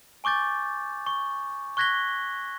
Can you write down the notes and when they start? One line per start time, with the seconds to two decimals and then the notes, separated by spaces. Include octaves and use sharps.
0.24 G#5 C#6 D6 G6 A6
1.07 C#6
1.77 C#6 F#6 G#6 A#6 B6 G7